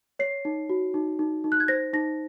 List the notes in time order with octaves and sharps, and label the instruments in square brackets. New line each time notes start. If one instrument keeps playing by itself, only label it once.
[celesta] C#5 C7
D#4
F#4
D#4
D#4
D#4
F#6
G#6
C5 A#6
D#4 A#6